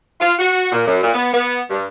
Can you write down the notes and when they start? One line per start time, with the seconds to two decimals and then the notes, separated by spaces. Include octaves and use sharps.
0.21 F4
0.39 F#4
0.72 A#2
0.86 F#2
1.02 A#2
1.14 B3
1.33 B3
1.70 G2